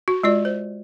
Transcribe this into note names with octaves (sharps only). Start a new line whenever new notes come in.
F#4
G#3 F4 D5
C5